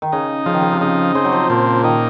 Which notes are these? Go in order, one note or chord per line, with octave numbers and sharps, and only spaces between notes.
D#3
C#3 D#4
C#3 F3
D#3
C#3
C3
C#3 D#4
C#3 C4
F#3
F3
A#2 F3
D#3 D#4